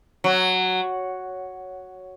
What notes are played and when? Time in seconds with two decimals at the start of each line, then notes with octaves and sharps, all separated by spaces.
0.24 F#3